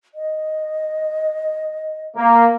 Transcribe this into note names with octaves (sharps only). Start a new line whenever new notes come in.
D#5
A#3